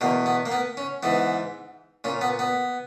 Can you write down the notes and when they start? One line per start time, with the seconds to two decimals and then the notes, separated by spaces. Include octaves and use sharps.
0.01 E2 B2 A#3
0.26 B3
0.46 A#3
0.52 B3
0.77 C#4
1.03 G#2 E3 B3
2.04 A#2 C#4
2.21 B3
2.39 B3